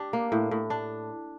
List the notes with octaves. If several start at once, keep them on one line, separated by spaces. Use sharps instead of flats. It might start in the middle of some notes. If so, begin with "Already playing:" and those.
Already playing: D4 G4
A#3
A2
A2
D4